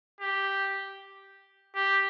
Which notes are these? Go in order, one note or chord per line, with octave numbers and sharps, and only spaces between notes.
G4
G4